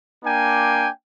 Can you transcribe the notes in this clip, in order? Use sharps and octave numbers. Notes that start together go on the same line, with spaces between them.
A#3 D4 G5 G#5